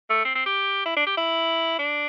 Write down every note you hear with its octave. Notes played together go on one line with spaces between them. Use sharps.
A3
C4
C4
G4
E4
D4
G4
E4
D4